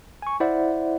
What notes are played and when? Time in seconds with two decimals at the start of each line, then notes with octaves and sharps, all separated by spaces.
0.22 G#5 C#6
0.40 E4 C5 D5 E5 F#5